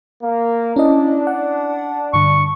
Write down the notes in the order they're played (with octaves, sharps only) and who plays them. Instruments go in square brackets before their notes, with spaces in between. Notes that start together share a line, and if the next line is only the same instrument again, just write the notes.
[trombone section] A#3
[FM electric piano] C#4 E4 D#5 [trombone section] D4
[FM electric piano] F#5
[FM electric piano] G2 D3 [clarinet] C#6